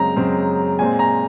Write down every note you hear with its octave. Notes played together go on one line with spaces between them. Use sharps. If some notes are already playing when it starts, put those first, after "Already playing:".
Already playing: F#2 C#3 G#3 C4 A#5
F#2 C#3 G#3 C4
A#2 G#3 C4 G#5
A#5